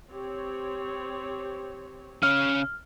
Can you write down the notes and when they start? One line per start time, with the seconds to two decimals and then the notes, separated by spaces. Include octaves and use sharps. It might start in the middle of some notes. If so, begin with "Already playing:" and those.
0.11 C4 G4 C#5
2.23 C#3 C#4 F6